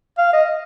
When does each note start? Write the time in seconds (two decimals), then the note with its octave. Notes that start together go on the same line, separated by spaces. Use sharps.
0.18 F5
0.33 D#5